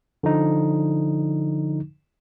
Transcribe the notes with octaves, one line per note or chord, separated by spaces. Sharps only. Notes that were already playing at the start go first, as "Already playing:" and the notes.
D3 F3 D#4